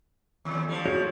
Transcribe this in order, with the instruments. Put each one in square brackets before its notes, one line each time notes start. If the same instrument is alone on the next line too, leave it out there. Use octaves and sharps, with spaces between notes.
[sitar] D#2
F3 G3
[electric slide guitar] F#4 G#4 C#5